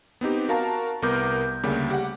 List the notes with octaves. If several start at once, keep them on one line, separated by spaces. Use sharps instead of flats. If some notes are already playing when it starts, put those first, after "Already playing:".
B3 C4 D#4 G4
F#4 A#4 F5 A5 A#5
C2 B3 A#4 D6 G6
D2 C#3 G3 A#3 G4
G4 F#5